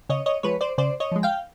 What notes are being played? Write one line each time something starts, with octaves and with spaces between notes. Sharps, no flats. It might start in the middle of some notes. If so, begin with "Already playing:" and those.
C#3 C#5 D#5
C#5 D#5
F3 G#3 B4 C#5
C5 D5
C#3 C5 D5
C#5 D#5
F3 G#3
F5 G5